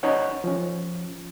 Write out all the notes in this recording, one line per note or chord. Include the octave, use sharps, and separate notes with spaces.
C#4 D#4 C#5 F#5
F3 C#4